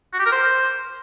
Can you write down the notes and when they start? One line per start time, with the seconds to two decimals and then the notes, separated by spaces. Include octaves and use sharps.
0.13 F#4
0.19 G4
0.26 A#4
0.32 C5